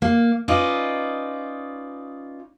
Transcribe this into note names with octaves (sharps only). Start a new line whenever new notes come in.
A#3
C#4 D#4 F4 B4 D5 D#5